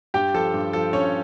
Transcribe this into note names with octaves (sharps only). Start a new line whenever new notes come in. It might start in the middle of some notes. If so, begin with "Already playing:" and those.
G2 G4 G5
F3 A4 A5
G2
F3 A4
G2 C#4 C#5